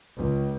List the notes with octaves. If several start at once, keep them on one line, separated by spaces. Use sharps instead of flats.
C#2